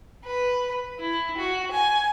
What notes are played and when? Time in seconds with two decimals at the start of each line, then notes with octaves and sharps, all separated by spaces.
0.24 B4
0.99 E4
1.37 F#4
1.71 G#5